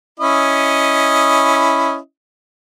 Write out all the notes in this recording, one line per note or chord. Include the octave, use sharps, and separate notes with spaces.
C#4 E4 D#5